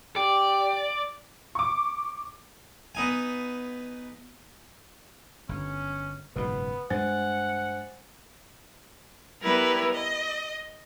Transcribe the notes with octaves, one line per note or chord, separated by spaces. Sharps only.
G4 D5
C#6 D6
B3 D#4 G#5
G1 C#4
F#1 G#2 B2 B3 B4
G2 G#3 C5 F#5 G#5 A6
G3 B3 E4 A#4 B4
D#5